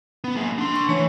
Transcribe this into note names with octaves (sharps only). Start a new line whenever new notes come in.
B3
A#3 G#4
D4 C6
C#6
E3 A3 C#5